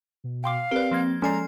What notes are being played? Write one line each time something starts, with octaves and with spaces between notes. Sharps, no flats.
B2
F5 G5 C6 D6
C4 G4 A#4 B4 D5
F3 A#3 G#6
F3 G#3 C#4 A4 D5 G#5 A#5 C7